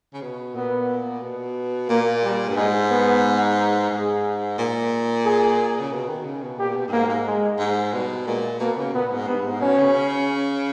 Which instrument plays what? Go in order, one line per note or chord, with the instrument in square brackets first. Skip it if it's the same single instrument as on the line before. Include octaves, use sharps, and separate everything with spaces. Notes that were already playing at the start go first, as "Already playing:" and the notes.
[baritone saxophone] C#3
B2
[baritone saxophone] A#2 [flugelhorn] B3
[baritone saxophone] B2
[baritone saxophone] A#2 [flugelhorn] A#3
[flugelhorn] G3
[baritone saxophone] G2
[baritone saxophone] G#2 [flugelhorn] G#3
[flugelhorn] B3
[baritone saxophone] G#2 [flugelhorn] G#4
[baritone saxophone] A#2
[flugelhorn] G#4
[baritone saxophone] C#3
B2
D#3
C#3
B2
[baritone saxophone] A#2 [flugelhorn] G4
[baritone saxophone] B2
G2
[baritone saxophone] G#2 [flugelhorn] A#3
[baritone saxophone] G#2
[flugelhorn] G#3
[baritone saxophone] G#2
[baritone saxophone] B2 [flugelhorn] G3
[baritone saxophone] A#2 [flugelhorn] G#3
[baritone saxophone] B2 [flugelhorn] A#3
[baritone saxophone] C#3
[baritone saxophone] A#2 [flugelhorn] B3
[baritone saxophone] G#2
[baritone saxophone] G2 [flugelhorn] B3
[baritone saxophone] G#2
[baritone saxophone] B2 [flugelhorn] C#4
[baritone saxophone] C#3